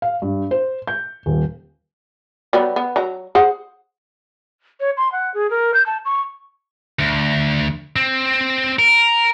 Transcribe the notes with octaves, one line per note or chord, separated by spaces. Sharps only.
F5
G2
C5
G6
D#1
F#3 G3 B3
B3
F#3 A#5
G#4 C5 F#5
C#5
C6
F#5
G#4
A#4
G6
A5
C#6
D2
C4
A#4